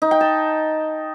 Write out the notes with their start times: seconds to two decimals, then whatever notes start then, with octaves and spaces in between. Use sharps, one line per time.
0.02 D#4
0.11 G5
0.21 A5